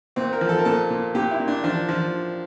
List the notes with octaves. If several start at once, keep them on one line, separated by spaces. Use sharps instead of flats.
A#2 C4
A#4
F3
A4
A#4
A#2 A4
A#2
A#2 G4
E4
A#2
D4
F3 D4
F3